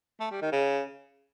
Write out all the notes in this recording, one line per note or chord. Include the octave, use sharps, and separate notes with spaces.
A3
G3
D#3
C#3